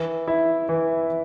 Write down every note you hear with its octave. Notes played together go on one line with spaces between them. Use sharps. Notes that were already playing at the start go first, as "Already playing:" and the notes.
Already playing: E3
E4
E3